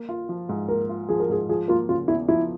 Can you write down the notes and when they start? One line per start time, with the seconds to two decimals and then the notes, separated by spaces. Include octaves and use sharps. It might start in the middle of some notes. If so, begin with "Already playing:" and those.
Already playing: A#3
0.09 F4
0.29 F3
0.49 G#2
0.68 A#3 A#4
0.89 F4
1.09 F3 G#4
1.20 A#4
1.29 G#2 G#4
1.49 F3 G#4
1.68 A#3 F4
1.89 C#3 F4
2.08 E2 E4
2.28 F3 E4